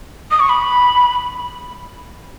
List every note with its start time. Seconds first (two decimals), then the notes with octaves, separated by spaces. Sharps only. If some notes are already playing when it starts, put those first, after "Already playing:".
0.31 D#6
0.40 C#6
0.49 B5